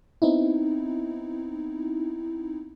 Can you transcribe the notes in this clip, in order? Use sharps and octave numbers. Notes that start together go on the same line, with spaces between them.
B3 C4 D#4 E4